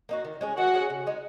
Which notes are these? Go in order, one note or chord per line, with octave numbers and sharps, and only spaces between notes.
A#3 D#4 F#4
D#3
G#3 C#4 G#4
D#3 F#4 F#5
G#3 C#4 G#4
C#3
G#3 D#4